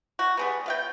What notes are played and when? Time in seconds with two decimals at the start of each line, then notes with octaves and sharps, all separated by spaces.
0.19 F#4
0.37 G3 G#3 B3
0.66 B3 F5 G5